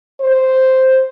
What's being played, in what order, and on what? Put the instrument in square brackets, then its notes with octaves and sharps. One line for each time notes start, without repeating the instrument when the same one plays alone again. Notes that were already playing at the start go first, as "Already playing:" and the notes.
[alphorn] C5